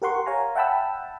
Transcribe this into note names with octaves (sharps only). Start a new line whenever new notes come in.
G4 A#4 F#5 C6 C#6
C#5 F5 G#5 A#5
E5 F#5 G5 A5 B5 E6